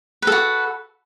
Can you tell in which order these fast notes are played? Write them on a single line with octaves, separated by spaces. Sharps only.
B4 A4 F#4